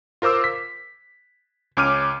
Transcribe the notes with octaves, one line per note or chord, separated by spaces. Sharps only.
F4 A#4 C5 D6 E6
B6
C#2 C#4 D6 F6 D#7